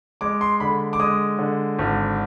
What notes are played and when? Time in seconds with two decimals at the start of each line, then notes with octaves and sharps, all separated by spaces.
0.21 G#3 D6
0.41 C6
0.60 D3 B5
0.93 D6
1.00 G#3 D#6
1.39 D3
1.79 G#1